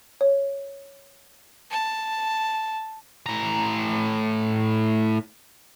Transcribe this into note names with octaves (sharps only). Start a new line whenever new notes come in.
C#5
A5
A2 A#5